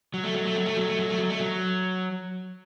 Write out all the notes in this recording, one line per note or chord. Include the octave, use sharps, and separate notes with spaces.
F#3
A3
F#3
A3
F#3
A3
F#3
A3
F#3
A3
F#3
A3
F#3